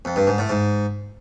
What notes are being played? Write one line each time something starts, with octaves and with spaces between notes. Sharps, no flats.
F2
G2
G#2
A2
G#2